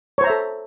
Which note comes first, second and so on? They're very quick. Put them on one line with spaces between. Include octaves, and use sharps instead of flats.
C#5 C5 A#5 E5 A4